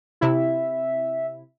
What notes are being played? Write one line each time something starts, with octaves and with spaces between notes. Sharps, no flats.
C3 E4 E5